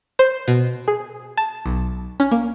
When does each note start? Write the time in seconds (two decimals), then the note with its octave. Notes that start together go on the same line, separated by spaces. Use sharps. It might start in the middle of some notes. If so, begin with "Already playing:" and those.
0.19 C5
0.48 B2
0.88 G#4
1.37 A5
1.66 B1
2.20 C#4
2.31 A#3